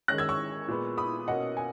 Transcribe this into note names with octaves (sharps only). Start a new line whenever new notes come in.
D#3 G#3 C#4 F#6 A#6
E6 G#6
C#6 E6
A#2 G#3 B3
B5 D#6
B2 A#3 C#4 D#5 F#5
G#5